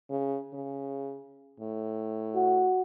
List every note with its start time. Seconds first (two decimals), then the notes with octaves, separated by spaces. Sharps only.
0.10 C#3
0.54 C#3
1.60 A2
2.35 F#4